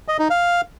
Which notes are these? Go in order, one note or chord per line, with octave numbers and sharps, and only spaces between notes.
D#5
D#4
F5